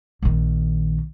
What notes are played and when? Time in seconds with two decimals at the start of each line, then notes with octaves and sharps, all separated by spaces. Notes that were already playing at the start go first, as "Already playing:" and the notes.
0.22 A#1 D#3